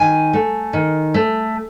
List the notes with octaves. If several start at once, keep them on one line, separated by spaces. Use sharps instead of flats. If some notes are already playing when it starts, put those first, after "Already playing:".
Already playing: D#3 G#5
A3
D#3
A3